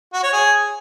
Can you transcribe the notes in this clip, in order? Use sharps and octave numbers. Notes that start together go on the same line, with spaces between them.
F#4
C#5
G#4